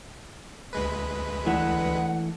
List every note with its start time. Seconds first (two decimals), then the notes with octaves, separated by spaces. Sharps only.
0.73 D2 G#3 B4
1.46 E3 A3 D4 F#5